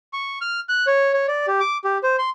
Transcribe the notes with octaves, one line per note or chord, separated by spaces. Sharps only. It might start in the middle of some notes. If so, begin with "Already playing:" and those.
C#6
F6
F#6
C#5
C#5
D5
G4
D6
G4
C5
C6